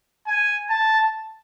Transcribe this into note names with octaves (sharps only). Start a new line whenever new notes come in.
G#5
A5